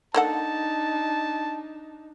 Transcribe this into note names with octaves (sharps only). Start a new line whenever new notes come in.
A#3 D4 D#4 A4 F#5 A5